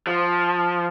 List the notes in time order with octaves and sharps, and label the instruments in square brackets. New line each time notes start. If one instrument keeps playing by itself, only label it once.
[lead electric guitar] F3